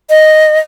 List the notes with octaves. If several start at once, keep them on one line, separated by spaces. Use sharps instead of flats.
D#5